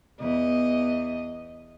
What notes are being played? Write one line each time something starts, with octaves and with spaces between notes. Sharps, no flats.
E2 D#5